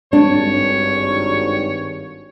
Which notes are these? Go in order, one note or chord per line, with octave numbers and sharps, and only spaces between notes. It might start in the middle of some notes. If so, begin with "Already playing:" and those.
G#1 G2 D4 C#5